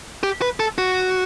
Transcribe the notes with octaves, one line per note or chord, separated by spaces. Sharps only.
G4
B4
A4
F#4